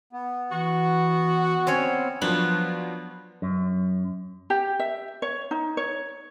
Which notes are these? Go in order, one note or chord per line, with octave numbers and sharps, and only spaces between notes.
B3
E3 F#4
C4 C#4 C#5
F3 F#3 B3 D4
F#2
G4
E5
C#5
D#4
C#5